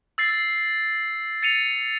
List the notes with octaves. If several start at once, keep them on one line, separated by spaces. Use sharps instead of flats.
E6 A6 C7
A6 C#7 D#7 F7